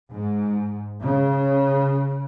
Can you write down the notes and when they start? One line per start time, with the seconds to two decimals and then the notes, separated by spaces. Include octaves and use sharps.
0.11 G#2
1.01 C#3